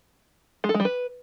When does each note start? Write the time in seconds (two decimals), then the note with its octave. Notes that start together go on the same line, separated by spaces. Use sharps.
0.64 G#3
0.69 A4
0.74 G#3
0.80 G3
0.85 B4